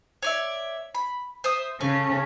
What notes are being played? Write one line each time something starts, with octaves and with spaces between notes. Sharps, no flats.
C#5 D5 E5
B5
C5 E5 D#6
C#3 A3 C#4